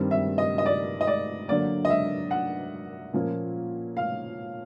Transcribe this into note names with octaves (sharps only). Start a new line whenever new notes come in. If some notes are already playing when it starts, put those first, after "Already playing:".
Already playing: G2 D#3 G3 C4
E5
D#5
D#5
D5
D#5
D5
D3 F#3 A#3 D5
D#5
E5
F#5
A#2 F3 A#3 C#4
F5